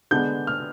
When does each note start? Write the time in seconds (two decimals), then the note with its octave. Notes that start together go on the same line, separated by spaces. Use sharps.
0.11 D3 G#3 B3 D4 G6
0.47 F6